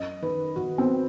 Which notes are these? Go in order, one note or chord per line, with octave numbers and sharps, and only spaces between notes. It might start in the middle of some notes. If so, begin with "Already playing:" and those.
Already playing: F#2 D#5
D#3 B4
D#3 F#4
C4